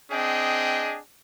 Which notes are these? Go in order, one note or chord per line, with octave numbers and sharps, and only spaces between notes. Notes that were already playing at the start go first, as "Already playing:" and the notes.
C4 D4 G#4 D#5 G5